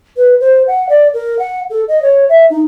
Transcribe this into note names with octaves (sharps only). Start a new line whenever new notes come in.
B4
C5
F#5
D5
A#4
F#5
A4
D#5
C#5
E5
D#4